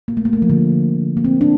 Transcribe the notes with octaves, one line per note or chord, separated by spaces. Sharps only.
A#3
A3
A#3
A3
F3
D3
A#3
C4
D4